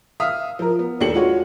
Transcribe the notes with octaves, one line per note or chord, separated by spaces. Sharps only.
E5 F5 D#6 F6
F3 A#4
B3
D#2 D4 G4 A4 C#7 F#7
G#3 F4 F#4 C#5